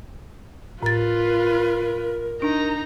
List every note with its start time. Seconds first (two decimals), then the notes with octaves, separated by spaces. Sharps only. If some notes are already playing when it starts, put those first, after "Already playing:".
0.83 A2 F4 A#4 B4 A6
2.42 D4 D#4 A#5